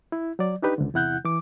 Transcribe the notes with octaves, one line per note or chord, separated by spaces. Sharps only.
E4
F#3 D5
D4 D#4 G4 B4
C#2 D3
E2 C3 E4 F#5 F#6 G6
E3 D6